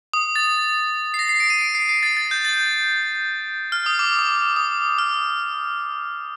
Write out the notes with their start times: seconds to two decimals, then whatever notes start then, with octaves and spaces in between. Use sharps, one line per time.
0.14 D#6
0.36 A6
1.14 C7
1.19 A#6
1.29 C7
1.40 D7
1.50 D#7
1.61 D7
1.75 C7
1.89 C7
2.03 A6
2.17 A6
2.31 G6
2.45 A6
3.72 F6
3.86 D#6
3.99 D6
4.19 D6
4.56 D#6
4.98 F6